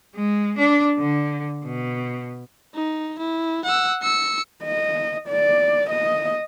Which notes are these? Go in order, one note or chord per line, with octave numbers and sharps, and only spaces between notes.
G#3
D4
D3
B2
D#4
E4
F#5 E6
E6 C#7
D#5
D5
D#5